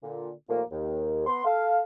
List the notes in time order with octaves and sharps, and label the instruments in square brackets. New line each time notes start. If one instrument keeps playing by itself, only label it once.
[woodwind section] A#2 D3
D#2 A#2 F3 A3 A#3
D#2
B3 C6
A4 F5